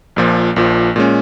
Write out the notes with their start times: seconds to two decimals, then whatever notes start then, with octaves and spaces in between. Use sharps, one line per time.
0.16 A#1 A#2 F3
0.56 A#1 A#2 F3
0.96 A#2 G#3 C#4